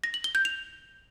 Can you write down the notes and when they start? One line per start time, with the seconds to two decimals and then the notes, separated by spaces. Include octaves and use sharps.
0.04 A#6
0.14 F#7
0.24 G7
0.35 G6
0.45 F7